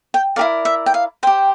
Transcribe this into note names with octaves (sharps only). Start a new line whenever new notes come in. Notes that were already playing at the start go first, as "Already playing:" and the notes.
G5
E4 G4 A#4 D5 F5
E5
G5
F5
G4 C5 G5